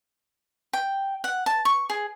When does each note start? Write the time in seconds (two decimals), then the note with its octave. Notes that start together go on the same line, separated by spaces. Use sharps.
0.73 G5
1.24 F#5
1.46 A5
1.65 C#6
1.90 G#4